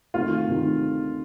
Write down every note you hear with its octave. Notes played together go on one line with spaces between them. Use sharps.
D2 C3 D#3 F4
D2 C3 D#3